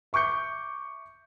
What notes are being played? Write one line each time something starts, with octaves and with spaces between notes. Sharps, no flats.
E5 C#6 D6 G6 C#7